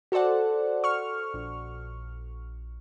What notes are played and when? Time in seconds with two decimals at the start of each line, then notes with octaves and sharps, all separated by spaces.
0.12 F#4 A4 C5 D5 F#5
0.84 C#6 F6
1.34 A#1